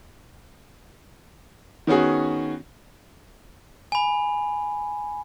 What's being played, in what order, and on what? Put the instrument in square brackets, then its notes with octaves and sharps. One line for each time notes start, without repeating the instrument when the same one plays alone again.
[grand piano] D#3 B3 C#4 F#4 G#4
[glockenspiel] G#5 B5